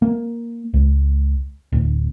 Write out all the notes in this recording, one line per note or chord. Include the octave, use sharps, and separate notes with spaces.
A#3
C#2
D1